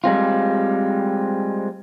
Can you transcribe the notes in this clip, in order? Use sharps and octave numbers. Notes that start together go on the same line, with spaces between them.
G3 G#3 C4 F4